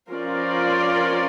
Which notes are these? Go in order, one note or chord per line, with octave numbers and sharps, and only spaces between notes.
F3 C#4 F4 A#4 D5